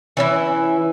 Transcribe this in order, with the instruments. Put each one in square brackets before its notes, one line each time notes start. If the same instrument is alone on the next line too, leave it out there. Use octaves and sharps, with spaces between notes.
[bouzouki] E3 C#4 E4